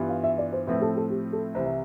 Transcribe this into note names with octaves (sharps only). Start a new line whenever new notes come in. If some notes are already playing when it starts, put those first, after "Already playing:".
Already playing: G2 E3 G3 B3 F4
F5
E5
D5
C5
A2 F3 A3 C4 E4 B4
A4
A4
G4
A4
C2 C3 E3 C5
E5